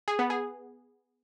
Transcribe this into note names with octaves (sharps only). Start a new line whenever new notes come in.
G#4
B3
G#4